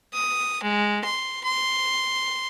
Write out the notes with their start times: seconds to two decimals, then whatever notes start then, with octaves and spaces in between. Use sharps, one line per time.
0.14 D#6
0.63 G#3
1.05 C6
1.44 C6